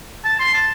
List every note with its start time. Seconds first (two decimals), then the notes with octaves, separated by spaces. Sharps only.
0.25 A5
0.40 C6
0.54 A5